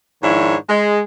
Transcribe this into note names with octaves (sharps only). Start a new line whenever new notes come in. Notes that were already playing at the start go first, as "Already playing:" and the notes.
G#2 D#3 F3 D4 E4 C#5
G#3